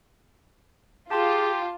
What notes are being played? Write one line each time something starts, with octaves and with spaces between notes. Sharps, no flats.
F4 G4 G#4 A5 C6 D6